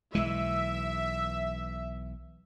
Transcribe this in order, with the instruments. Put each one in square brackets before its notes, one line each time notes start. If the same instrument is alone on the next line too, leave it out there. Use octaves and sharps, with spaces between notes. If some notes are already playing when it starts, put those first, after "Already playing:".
[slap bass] B1 E3 [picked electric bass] G#3 [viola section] E5